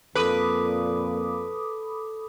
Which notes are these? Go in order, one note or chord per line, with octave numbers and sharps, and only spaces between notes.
F2 A#2 A4 B4 B5 D6 D#6